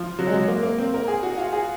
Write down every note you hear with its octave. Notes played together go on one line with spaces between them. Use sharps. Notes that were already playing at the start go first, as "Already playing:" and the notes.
Already playing: F3
F#3
G#3
F#3
A#3
A#3
C4
A#4
G#4
F#4
F4
G#4